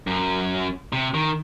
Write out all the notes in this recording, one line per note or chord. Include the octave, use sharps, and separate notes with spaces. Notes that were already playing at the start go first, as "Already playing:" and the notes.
F#2
C3
D#3